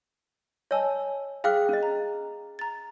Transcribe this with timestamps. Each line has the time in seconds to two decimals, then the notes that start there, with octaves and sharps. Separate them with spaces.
0.71 C#5 D#5 G#5 A5 E6
1.44 G#4 F5 G5 D6 F6 F#6
1.69 C#4 D#5
1.83 A#5
2.59 A#5 A6